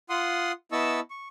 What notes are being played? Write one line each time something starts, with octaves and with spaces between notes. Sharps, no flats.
F4 F#5 C6 D#6
B3 E4 D#5 A5 C#6 E6
C#6